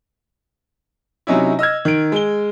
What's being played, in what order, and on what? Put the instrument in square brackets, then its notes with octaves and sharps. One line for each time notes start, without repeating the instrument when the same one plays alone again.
[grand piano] C3 F#3 C#4 D#4 E4
D#5 E6 F6 G#6
D#3 D7
G#3 G7